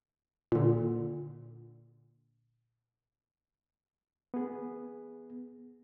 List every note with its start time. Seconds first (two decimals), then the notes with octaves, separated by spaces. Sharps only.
0.52 A#2 D3
4.34 B3 G#4